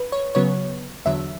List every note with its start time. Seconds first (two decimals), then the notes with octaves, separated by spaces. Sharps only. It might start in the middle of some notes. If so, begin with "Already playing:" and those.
Already playing: B4
0.12 C#5
0.35 C#3 F#3 B3 C#5
1.05 E2 D3 F#3 E5